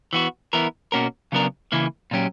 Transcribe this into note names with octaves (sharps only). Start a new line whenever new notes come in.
E3 B3 F#4
E3 B3 E4 A#4
B2 A#3 C#4 F#4 A#4
C#3 F#3 B3 D4 A#4
C#3 E3 A#3 E4
A#2 F#3 C#4 G4